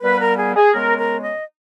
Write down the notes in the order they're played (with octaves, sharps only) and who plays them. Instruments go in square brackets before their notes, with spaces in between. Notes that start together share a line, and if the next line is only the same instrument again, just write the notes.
[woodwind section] A#2 G3 B3 B4
A#4
G#4
G#4
C#3 G#3 B3 A#4
A#4
D#5